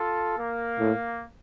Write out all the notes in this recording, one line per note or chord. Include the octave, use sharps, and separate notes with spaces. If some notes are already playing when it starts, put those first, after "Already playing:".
Already playing: F4 A4
A#3
A2